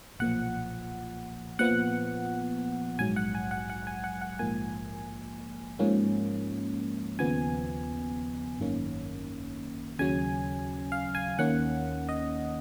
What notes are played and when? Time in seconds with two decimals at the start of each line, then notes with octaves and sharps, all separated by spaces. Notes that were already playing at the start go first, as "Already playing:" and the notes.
0.19 B1 A#2 F3 F#5
1.59 A#2 F3 B3 F#5
2.99 A#1 G#2 F#3 G#5
3.16 F#5
3.35 G#5
3.51 F#5
3.70 F#5
3.87 G#5
4.04 F#5
4.21 F#5
4.39 A#1 G#2 F3 A#3 G#5
5.79 G#2 F3 A#3 C#4
7.19 D#2 C#3 F3 B3 G#5
8.59 G#1 F#2 D#3 A#3 C#4
9.99 D#2 C#3 F#3 C#4 G#5
10.92 F5
11.15 G#5
11.39 D#2 D#3 A#3 C#4 F#5
12.09 D#5